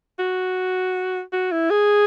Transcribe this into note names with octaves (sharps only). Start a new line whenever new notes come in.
F#4
F#4
E4
G#4